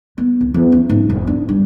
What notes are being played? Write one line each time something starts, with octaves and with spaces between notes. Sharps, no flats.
B3
C2
E2
C#4
G#2
E1
D4
G2